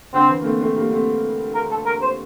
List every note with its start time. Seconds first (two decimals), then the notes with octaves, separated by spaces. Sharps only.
0.14 D3 C4
0.29 E3
0.41 A#3
0.44 A3 C4
0.61 A3 C4
0.76 G3 A#3
0.92 A3 C4
1.54 A#4
1.71 A4
1.86 A#4
2.02 C5